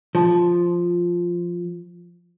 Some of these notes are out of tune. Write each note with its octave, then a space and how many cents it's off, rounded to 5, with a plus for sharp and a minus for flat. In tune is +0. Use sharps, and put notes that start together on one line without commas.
F3 +0